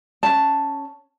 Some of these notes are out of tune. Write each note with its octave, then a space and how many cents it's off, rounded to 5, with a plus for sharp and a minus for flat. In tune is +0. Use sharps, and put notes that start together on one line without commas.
C#4 +0 A5 +0